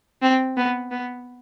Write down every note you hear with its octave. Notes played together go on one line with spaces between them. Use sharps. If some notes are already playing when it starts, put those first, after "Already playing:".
C4
B3
B3